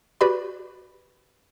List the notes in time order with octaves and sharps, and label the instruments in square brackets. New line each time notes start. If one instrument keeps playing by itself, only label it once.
[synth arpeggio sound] F#4 G4 B4 D5 B5